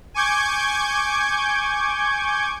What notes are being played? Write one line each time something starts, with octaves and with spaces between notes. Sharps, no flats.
G#5 C#6 D6 G6 G#6